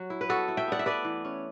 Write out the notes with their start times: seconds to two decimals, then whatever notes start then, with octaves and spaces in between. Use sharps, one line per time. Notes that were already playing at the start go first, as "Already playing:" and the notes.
Already playing: F#3 F#4
0.10 E4
0.21 B4
0.29 B3 F#4 A4
0.48 E4
0.57 E5 G5
0.68 B3 D5 F#5
0.79 E5
0.86 A3 B4 D5
1.05 E3
1.25 C#4